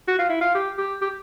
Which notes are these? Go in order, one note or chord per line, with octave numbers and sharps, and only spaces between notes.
F#4
F4
E4
F4
G4
G4
G4